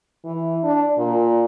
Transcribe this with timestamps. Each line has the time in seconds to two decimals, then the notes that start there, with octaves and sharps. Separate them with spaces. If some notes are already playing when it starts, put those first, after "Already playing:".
0.25 E3
0.64 D4
0.98 A#2